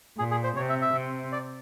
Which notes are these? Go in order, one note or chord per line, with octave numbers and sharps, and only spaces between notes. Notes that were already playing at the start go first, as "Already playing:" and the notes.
A#2 G#4
G#4
C5
C3 C#5
E5
E5
C3
D5